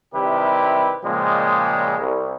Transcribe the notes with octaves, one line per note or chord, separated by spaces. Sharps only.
C3 D#3 G3 E4 G4 B4
A#2 C#3 F3 G3 G#3
C2